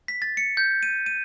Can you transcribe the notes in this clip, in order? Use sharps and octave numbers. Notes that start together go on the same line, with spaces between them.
B6
A6
C#7
G6
D#7
D#7